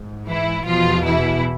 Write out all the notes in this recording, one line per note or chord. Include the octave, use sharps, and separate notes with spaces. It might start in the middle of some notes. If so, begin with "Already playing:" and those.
Already playing: G#2
E3 E4
E2 B2 F3 F4
E3 E4